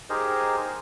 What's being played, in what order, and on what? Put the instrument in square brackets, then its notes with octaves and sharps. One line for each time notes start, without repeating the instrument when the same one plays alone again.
[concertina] D#4 G4 G#4 A#4 C5 D#5